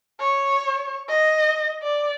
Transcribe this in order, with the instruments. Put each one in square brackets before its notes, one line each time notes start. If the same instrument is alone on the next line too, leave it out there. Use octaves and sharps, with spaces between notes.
[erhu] C#5
D#5
D5